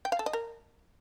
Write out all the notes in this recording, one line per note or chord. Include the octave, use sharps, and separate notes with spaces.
G5
F5
A4
D#5
A#4